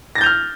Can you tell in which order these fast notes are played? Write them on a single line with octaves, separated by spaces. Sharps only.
A#6 A6 G6 F7 F6